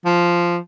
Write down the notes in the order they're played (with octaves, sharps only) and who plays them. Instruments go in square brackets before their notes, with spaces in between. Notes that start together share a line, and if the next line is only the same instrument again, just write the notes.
[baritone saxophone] F3